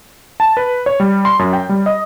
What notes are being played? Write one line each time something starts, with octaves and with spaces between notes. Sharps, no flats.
A5
B4
C#5
G3
C6
F#2
G5
G3
D#5